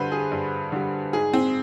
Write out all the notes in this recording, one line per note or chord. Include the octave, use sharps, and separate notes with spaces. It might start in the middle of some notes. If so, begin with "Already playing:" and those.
Already playing: G2 D3 G3 B4 C5
G#4
G2
D3 G3
G#2 G#4
C4